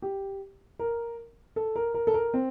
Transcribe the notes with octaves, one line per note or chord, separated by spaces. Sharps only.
G4
A#4
A4
A#4
A#4
A4
A#4
C4